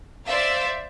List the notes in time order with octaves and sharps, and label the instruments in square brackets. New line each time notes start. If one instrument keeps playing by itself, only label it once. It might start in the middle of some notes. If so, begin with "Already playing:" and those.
[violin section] C5 D5 E5 F5